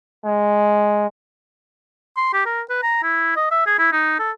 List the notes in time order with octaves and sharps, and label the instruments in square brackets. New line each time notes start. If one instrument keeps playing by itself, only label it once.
[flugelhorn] G#3
[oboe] C6
G4
A#4
B4
A#5
E4
D#5
E5
G#4
E4
D#4
A4